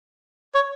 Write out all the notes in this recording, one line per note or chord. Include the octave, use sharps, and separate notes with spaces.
C#5